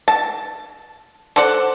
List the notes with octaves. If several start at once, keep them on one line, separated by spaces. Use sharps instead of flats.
A5
A4 C5 D5 F#5